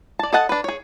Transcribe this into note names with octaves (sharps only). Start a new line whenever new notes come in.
D5 A5
A4 D#5 F#5 A5
D4 B4
G#4 C#5